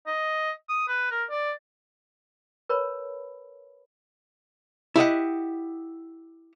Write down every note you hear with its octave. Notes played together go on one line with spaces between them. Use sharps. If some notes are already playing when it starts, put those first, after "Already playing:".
D#5
D#6
B4
A#4
D5
A#4 B4 C#5 A5 B5
E4 G4 D#5 F#5